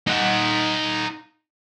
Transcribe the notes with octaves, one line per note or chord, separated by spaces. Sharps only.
D#4 F#5